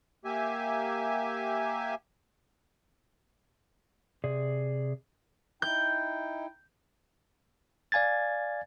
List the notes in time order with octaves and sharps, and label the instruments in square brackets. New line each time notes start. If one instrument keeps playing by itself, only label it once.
[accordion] A#3 G4 E5 G#5
[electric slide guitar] C3 G#4 D5
[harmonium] D#4 E4 G5 [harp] G6
[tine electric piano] D5 F5 G#5 G#6 A6